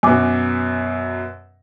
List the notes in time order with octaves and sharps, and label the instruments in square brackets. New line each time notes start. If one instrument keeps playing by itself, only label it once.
[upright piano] F#2 B2 [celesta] G#5 D6